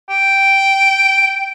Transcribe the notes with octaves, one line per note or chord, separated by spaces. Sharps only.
G5